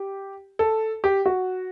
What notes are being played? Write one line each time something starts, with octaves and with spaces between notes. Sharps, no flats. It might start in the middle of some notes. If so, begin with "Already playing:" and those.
Already playing: G4
A4
G4
F#4